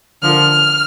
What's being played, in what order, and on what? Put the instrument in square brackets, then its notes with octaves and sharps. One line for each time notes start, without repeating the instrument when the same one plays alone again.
[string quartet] D3 F3 A#3 F6